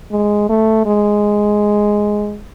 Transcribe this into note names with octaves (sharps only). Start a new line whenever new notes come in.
G#3
A3
G#3